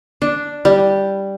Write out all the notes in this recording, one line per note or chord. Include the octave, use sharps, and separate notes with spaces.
D4
G3